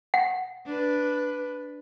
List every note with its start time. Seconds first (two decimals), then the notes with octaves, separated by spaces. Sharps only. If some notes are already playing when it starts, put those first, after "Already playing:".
0.14 F#5
0.66 D4 B4